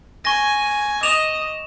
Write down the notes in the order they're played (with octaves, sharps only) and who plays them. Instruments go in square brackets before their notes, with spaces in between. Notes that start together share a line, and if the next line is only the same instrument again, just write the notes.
[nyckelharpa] G#5 [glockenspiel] C#6 A#6
[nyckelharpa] D#5 [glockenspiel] D6 E7 F7